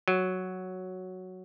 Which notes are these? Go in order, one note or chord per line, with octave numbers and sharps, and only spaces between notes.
F#3